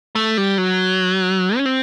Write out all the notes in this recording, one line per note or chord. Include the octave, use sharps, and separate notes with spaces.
A3
G3
F#3
C#4
C4